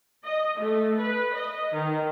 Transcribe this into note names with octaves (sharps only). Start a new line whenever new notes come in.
D#5
A3
B4
D#5
D#3